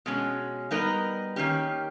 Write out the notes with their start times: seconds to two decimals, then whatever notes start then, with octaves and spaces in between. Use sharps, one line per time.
0.06 B2 G#3 C#4
0.71 G3 B3 D#4 A#4 D#5
1.36 D#3 A#3 C#4 G4